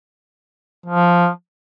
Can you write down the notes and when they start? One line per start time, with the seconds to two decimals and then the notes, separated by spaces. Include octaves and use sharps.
0.86 F3